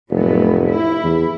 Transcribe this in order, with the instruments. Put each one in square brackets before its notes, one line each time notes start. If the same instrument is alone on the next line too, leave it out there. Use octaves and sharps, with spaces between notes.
[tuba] F1 [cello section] A2 F#3 B3
[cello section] E4
[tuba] E2